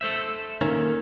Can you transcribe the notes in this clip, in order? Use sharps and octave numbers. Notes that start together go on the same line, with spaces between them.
A4 C5 E5
D#3 A#3 C#4